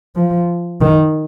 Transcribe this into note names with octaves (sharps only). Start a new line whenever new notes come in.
F3
D#3